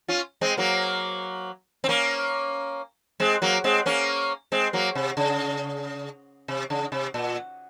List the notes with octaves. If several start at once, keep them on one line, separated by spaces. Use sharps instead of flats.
C#4 F4
G#3 C4
F#3 A#3
C4
A#3 C#4
G#3 C4
F#3 A#3
G#3 C4
A#3 C#4
G#3 C4
F#3 A#3
C3
C#3
C3
C#3
C3
A#2